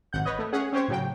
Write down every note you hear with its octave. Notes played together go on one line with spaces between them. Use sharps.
G#1 F#5 G6
B4 C#5 D#5
A3
C#4 G#4 C#5 F#5
C4 C#4 G4 C5 C#5
A2 C#3 F#3 G5